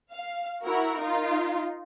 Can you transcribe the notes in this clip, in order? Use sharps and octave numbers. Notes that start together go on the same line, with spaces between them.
F5
E4 F#4 A#4
D#4 F4